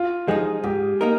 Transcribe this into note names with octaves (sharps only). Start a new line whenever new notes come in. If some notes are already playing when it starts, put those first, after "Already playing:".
Already playing: F4
F3 G#3 D#4 G#4
G#2 G4
A#3 D#4 A#4